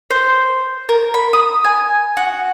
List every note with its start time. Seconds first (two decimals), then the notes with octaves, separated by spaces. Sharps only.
0.11 C5
0.89 A#4
1.14 B5
1.33 D#6
1.64 G#5
2.17 F#4